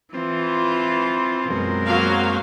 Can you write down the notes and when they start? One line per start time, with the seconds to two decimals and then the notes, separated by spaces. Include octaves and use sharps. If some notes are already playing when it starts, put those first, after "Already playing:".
0.14 E3 C4 F4
1.50 F#2 B2 G#3 C4 A#4
1.86 F#3 A#3 F5